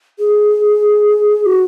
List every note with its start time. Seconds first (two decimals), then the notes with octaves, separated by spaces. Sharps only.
0.19 G#4
1.46 F#4